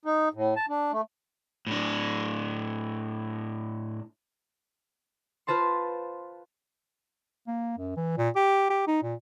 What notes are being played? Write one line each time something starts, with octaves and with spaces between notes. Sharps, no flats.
D#4
A2
A5
D4
A3
A2 D4
F4 B4 C5 A5 C6
A#3
F#2
E3
A#2
G4
G4
D#4
A#2